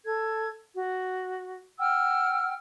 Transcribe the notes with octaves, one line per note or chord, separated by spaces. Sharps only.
A4 G#6
F#4
F#5 G5 E6 F6